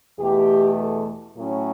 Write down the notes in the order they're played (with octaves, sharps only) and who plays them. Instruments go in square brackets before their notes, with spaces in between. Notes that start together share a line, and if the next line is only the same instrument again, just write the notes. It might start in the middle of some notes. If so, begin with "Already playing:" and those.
[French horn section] E2 B2 A3 G4
A4
A2 F#3 C#4